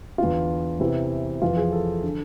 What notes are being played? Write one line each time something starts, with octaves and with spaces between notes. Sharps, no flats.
E2 D3 F4
E2 C3 E3 E4
F2 E3 F4
G#4
A4
D3